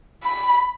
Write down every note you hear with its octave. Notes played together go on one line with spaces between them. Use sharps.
B5